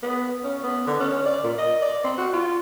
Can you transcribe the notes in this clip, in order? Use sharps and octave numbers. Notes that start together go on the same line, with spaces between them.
B3
C#4
B3
D3
C#4
D5
A#2
D#5
D5
C4
F#4
F4